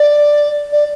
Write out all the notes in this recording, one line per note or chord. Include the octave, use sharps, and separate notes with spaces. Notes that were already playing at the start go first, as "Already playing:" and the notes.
Already playing: D5
D5